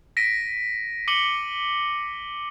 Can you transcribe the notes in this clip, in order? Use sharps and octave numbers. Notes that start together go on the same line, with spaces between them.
A#6 B6 D7 D#7
D6 C#7 D#7 F#7 G7